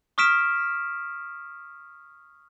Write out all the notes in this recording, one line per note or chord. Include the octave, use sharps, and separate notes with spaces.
C#6 D#6 F6 B6 D7 E7